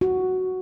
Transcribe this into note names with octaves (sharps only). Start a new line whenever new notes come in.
F#4